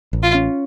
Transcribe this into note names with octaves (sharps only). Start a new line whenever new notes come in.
A1
F4
C#4